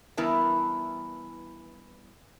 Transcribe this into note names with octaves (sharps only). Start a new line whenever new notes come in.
G2 E3 B3 E4 A#4 A5